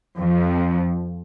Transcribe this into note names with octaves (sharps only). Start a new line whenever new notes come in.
F2 F3